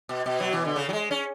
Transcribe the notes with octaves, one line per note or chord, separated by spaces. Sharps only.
B2
B2
F#3
E3
D3
C#3
F#3
G#3
C#4